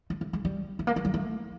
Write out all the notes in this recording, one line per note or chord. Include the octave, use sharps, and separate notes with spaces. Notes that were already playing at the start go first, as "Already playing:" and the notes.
A3
A3
G#3
G3
A3
A#3
A3
G3
A3